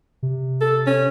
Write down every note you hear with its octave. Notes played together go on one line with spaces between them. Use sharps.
C3
A4
C#4